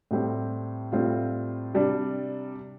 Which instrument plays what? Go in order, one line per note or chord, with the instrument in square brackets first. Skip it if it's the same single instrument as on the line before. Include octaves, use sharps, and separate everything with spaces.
[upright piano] A2 G3 C4 G4
A2 G3 C4 F4
C3 G3 D4